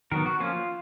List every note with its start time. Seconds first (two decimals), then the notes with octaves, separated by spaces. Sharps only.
0.12 D#3 F#3 B3 A#4
0.26 F#4
0.40 F3 A#3 C#4 F4